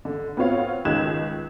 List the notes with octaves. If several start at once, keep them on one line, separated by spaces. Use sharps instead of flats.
D3
B3 C4 F4 C#5 F5
C#2 D#3 F#6 G#6 E7